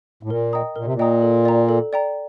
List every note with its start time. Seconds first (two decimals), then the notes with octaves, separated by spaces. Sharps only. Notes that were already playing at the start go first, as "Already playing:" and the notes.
0.23 A2
0.29 A#2 A#4
0.53 D#5 G5 A#5 D#6
0.76 A#2 A#4
0.84 C3
0.94 A#2
0.99 D#5 G5 A#5 D#6
1.22 A4
1.45 D5 G5 A#5
1.69 A4
1.93 D5 G5 A#5